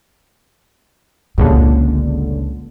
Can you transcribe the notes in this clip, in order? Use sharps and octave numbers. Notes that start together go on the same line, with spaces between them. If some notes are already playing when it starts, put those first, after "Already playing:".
G1 C#2 A#2 D3